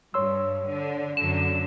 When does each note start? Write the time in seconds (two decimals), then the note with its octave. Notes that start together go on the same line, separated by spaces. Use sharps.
0.14 G2 C#5 C6 E6
0.67 D3
1.17 F#2 D3 E7